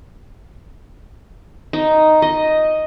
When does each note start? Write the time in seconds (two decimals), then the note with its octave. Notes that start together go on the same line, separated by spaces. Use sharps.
1.73 D#4
2.22 D#5